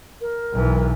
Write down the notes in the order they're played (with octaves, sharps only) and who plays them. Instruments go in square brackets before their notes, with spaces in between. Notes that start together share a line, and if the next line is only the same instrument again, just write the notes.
[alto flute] A#4
[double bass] B1 E3